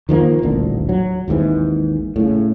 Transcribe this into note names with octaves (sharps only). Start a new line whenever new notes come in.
D#3 F3 G#3 A#3
D#1 A1 D2 D3
F#3
G#1 D#2 G#2 E3
A2 C#3